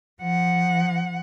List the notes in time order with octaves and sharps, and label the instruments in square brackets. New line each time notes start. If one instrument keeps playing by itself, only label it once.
[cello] F3 F#5